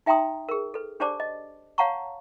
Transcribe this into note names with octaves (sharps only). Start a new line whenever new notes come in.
D#4 E5 G5 A#5 C6 D#6
G#4 A#4
A4 B4
D4 G4 C5 D5 A5 D6
D#5
C#5 F5 F#5 A5 A#5 C#6